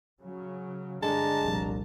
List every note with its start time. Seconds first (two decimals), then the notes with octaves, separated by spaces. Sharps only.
0.21 C#3 F#3
1.03 G2 D3 G#3 D4 A5 A#5
1.41 F1 C2 A#2